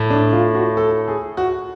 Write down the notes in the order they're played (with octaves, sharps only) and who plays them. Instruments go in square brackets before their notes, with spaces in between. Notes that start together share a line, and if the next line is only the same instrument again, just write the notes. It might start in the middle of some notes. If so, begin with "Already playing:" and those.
Already playing: [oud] A2
[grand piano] D4
F4
F#4
A4
G#4
F#4